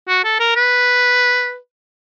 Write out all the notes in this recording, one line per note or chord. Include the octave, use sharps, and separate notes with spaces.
F#4
A4
A#4
B4